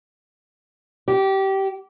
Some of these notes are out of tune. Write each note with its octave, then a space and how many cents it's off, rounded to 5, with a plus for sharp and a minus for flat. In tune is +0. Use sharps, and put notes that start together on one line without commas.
G4 -20